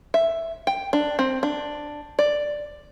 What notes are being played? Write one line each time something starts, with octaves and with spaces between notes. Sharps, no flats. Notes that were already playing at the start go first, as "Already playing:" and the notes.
E5
G5
D4
C4
D4
D5